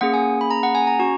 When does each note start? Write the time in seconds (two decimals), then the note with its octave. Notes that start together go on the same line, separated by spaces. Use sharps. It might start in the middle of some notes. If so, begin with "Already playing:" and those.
0.01 A#3 C#4 G#4 F#5
0.14 G#5
0.41 B5
0.51 A#5
0.63 F#5
0.75 G#5
0.87 A#5
0.99 C#4 F#4 C#6